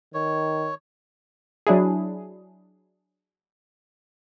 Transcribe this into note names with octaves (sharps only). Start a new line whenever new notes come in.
D#3 C#5
F#3 D4 E4 G#4